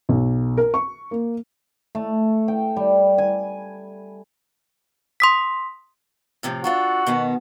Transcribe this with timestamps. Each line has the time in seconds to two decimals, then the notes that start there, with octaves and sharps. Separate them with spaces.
0.09 B1
0.58 A#4
0.74 C#6
1.11 A#3
1.95 A3
2.48 G5
2.76 G3
3.18 G#5
5.20 C6 D#6 B6
6.43 A2 C3 F3
6.64 D4 F4 F#4 A4
7.07 B2 D#3 B3